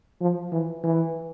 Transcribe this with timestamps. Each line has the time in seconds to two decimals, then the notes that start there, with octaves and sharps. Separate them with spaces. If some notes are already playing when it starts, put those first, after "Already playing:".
0.21 F3
0.52 E3
0.84 E3